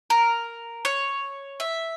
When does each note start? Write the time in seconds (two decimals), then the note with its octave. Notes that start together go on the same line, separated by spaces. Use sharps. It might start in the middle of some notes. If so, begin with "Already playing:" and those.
0.10 A#4
0.85 C#5
1.60 E5